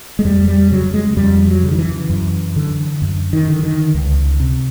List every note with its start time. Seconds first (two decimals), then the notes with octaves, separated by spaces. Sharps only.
0.19 G#3
0.25 F2 G3
0.48 G3
0.71 C#3 F#3
0.94 G#3
1.17 F2 G3
1.48 F#3
1.63 C#3
1.71 D#3
1.78 E3
2.10 F#2
2.56 D3
3.02 F#2
3.33 D#3
3.48 D3
3.63 D#3
3.94 C#2
4.40 C3